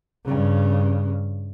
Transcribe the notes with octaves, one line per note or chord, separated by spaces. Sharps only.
G2 C#3